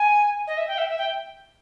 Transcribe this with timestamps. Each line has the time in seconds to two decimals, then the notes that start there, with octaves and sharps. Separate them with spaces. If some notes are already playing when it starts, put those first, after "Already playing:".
Already playing: G#5
0.47 D#5
0.57 E5
0.68 G5
0.78 E5
0.88 E5
0.98 G5